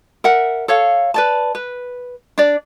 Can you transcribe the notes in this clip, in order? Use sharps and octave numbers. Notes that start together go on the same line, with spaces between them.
A#4 E5 F#5
A4 C#5 F5
B4 D5 A5
B4
D4 D5